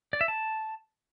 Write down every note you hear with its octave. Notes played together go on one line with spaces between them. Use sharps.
D5
E5
A5